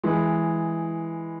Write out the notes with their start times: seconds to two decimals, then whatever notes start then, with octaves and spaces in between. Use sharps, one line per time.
0.04 E3 G#3